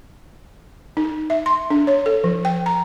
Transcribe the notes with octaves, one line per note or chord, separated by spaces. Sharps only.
D#4
E5
C6
D4
C#5
A4
F3
G5
A#5